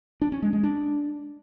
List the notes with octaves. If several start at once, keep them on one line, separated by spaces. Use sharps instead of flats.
D4
C#4
G#3
G#3
D4